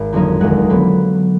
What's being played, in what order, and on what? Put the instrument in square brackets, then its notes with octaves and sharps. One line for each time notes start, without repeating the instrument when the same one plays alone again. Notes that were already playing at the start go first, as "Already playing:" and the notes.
Already playing: [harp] G#1
F2 D3 F#3 A#3 D#4
F1 D#2 D3 G#3 F#5
D3 F#3 B3